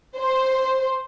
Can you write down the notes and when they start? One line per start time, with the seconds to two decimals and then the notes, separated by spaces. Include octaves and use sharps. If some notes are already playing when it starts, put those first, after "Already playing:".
0.18 C5